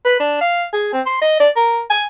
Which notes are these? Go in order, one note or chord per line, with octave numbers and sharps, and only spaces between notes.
B4
D4
F5
G#4
C4
C6
D#5
D5
A#4
G#5